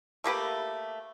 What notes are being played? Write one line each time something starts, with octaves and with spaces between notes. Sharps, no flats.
A3 A#3 G4 B4